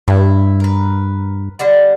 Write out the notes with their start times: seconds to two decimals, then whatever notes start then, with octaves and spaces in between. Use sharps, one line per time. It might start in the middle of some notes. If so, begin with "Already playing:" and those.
0.08 G2 E4
0.60 A#4 B4
1.59 D3 G3 F#5